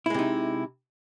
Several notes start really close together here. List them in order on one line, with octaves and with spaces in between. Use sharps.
E4 G#3 C3 D#4